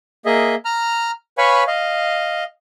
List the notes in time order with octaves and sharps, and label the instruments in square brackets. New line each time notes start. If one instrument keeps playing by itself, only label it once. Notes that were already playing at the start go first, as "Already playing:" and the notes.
[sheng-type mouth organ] A#3 G#4 D#5 E5
A#5 F6
B4 C#5 F5 G#5 B5 C#6
D#5 F5